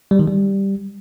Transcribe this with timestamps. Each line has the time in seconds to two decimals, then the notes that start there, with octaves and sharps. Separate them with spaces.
0.11 G3
0.19 D#3
0.28 G3